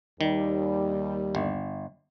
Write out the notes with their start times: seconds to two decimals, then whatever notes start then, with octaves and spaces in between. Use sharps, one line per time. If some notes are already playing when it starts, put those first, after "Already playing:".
0.21 D#2 D#3 G3
1.35 G1